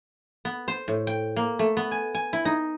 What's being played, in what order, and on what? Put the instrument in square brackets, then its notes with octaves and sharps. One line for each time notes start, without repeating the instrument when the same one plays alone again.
[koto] B3
C5
A2
G5
A#3
A3
B3
G#5
G#5
E4
D#4